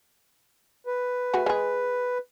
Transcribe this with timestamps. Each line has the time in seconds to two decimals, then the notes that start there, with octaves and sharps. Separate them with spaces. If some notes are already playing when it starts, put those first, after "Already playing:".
0.87 B4
1.34 A3 F#4 G#4
1.46 G#3 G#4